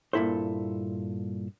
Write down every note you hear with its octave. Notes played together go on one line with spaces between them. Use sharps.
G2 A#2 D#3 E4 A4 C5